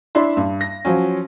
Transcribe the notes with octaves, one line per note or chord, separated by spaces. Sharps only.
D4 E4 E5 C6
G2
A#6
F3 F#3 C#4